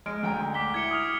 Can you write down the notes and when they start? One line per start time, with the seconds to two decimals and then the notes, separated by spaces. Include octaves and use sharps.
0.06 G#3 F6 D7
0.23 D2 G5 A#5
0.54 D6 B6 G7
0.74 E4 G#6 C#7 G7
0.91 D#6 F6 F7